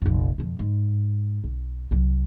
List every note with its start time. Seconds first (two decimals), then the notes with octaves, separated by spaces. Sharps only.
0.02 F1 A#1
0.38 F2 B2
0.59 G#2
1.44 B1
1.91 C2 F#3